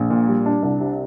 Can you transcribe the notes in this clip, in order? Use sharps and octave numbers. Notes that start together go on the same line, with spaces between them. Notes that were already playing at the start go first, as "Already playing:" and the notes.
Already playing: A#1
A#2
G3
D4
C2
C3